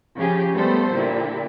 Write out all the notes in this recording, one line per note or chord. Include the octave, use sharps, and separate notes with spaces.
C#3 F3 G4 G#4
G3 A3 B3 A4 C5
A#2 D3 E4 G4